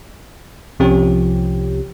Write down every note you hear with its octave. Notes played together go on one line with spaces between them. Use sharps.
C2 C3 F3 C#4 G4